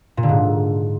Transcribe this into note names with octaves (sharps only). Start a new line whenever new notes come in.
A#2
D3
G#2